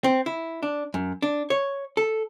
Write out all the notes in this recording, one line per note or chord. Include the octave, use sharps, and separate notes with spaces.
C4
E4
D4
F#2
D4
C#5
A4